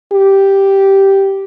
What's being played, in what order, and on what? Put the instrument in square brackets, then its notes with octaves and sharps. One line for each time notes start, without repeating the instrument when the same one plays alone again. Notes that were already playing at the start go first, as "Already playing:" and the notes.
[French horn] G4